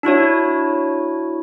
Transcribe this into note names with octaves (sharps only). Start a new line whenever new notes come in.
D4 E4 F#4 C#5